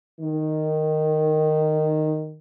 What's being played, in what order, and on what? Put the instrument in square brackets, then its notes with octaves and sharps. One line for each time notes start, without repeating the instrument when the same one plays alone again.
[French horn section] D#3